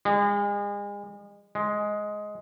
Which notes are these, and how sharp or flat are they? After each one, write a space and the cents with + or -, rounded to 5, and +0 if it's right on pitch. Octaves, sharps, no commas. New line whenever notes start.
G#3 -35
G#3 +10